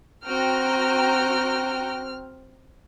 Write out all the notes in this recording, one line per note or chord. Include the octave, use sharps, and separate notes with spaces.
C4 F#4 G5 A#5 F6